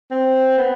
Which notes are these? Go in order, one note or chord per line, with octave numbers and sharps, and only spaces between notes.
C4
B3